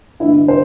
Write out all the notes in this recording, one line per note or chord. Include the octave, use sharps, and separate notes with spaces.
G2 D3 E4
C5